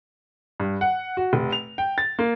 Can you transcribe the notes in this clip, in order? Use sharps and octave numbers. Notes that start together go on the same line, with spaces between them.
G2
F#5
F#4
F1
F7
G5
A6
A#3